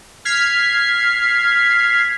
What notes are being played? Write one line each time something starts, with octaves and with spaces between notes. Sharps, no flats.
F6 G#6 B6 C7